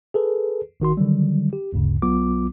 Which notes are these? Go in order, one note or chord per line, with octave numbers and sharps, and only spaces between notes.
G#4 A4 B4
A1 D#3 F#4 C6
D3 D#3 F#3 G3
G4
G1 D2 G2 C#3
B1 F#3 B3 F4 D6